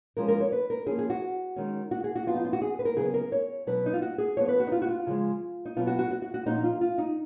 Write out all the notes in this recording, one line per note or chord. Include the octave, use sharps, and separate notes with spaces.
F3 G#3 C#4 A#4
A#4
C#5
B4
A#4
F3 A#3 C#4 G#4
G#4
F#4
D#3 G#3 C#4
F#4
G#4
F#4
F3 B3 F4
D#4
F4
F#4
G#4
B4
A#4
C#3 F#3 B3 G#4
A#4
C#5
B2 F#3 C#4 B4
D#4
F4
F#4
G#4
F3 B3 C#5
B4
F#4
D#4
F4
F#4
F4
C#3 F3 G#3
D#4
B2 F#3 B3 F4
F#4
F#4
F#4
F#4
F#4
A#2 F3 A#3 C#4 D#4
F4
F4
D#4